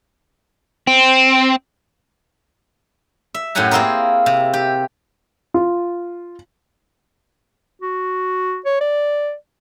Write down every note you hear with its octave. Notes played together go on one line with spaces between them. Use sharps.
C4
E5
F#2 A2 G4 F#5 G#5 A#5
A#3 C4 E4 F4 G#4 A#4
C3
G4
F4
F#4
C#5
D5